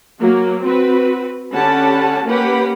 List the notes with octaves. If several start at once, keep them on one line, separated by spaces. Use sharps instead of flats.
F#3 A#3 F#4
C4 F#4 B4
D3 C#4 G4 F#5 A5 B5
A#3 C#4 G4 B4 F#5 B5